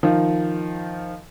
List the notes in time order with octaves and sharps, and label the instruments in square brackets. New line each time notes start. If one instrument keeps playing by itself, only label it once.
[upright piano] D#3 F3